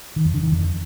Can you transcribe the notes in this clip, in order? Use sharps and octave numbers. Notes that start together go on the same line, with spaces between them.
D#3
F2
D3
D#3
F2